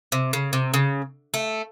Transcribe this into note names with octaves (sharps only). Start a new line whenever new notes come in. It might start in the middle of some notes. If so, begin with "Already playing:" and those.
C3
C#3
C3
C#3
A3